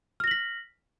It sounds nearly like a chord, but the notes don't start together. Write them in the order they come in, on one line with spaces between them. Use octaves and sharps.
F6 A#6 F#7 B6